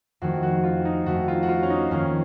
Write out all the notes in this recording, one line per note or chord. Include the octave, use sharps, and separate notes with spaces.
F2 D#3 A3 C4 F#4
F#4
F4
D#4
F2 D#3 A3 C4 F#4
F4
F#4
F4
C#4
D#4
F2 D#3 A#3 C#4 F4